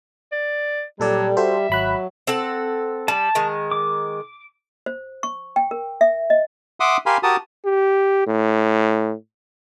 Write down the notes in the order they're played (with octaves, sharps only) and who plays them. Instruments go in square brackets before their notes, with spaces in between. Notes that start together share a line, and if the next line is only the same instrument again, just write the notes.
[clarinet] D5
[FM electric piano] A#2 A4 D5 [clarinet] F#3 [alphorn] G3
[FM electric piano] F#4 A4 C5 [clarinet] E5
[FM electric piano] G#1 B5 F#6 [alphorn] F#3
[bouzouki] C4 A4 F#5
[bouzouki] G3 [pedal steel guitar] A5
[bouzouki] D#3 G#3
[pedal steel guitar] D6
[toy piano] C5
C#6
G5
A#4
E5
D#5
[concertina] E5 F#5 C6 D6 D#6
G4 A#4 F5 G#5 B5 C6
F#4 G4 A#4 A5 D#6
[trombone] G4
A2